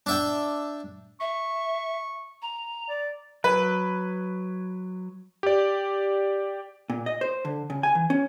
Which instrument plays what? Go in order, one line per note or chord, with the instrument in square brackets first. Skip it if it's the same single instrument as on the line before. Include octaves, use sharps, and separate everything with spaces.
[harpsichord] D4 E5 G5
[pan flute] E5 [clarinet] C#6
[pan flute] A#5
[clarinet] D5
[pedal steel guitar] F#3 [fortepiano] B4
[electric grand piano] G4 D5
[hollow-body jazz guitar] A#2
D#5
C5
D3
C#3
G#5
E3
C#4